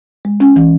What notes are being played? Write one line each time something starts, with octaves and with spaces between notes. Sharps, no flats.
G#3
C#4
E3